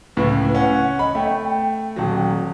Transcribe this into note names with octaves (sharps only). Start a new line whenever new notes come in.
C#2 A2 B4
C#4 F#5
D#5 B5
A3 G5
G5
D#1 F#3